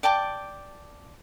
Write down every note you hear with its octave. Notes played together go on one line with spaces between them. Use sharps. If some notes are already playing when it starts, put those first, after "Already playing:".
D5 G5 A5 D6